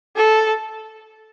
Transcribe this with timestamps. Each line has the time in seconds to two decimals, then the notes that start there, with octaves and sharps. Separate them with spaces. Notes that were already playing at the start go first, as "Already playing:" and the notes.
0.17 A4